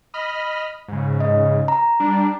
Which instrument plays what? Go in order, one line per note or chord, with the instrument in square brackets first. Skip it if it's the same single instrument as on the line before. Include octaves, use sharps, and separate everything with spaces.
[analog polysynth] D#5 B5 F6
G#2 C#3
[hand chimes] D#5
A#5
[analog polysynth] G3 D4